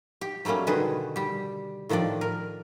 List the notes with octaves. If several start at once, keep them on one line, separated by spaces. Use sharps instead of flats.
G4
F#3 G3 A3 A#3 C#4
B2 D3 D#3 G#4 B4
G3 G4
A2 D#3 F3 D4 D5
A#4